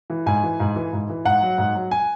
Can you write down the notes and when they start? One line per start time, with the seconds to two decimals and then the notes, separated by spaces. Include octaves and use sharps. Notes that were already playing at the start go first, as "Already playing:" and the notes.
0.10 E3
0.26 G#2 G#5
0.43 E3
0.60 G#2
0.76 E3
0.93 G#2
1.09 E3
1.25 G#2 F#5
1.42 F#3
1.58 G#2
1.75 F#3
1.91 G#5